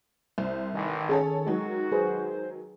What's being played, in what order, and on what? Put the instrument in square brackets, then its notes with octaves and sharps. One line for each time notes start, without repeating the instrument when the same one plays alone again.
[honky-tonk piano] C2 [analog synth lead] C5
[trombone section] A1 [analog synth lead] D#3
[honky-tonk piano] C#4 A4 C#5 [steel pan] G#4
[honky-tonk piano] D#3 F#3 G#3 [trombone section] F#4
[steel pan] G#4 B4 [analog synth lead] C5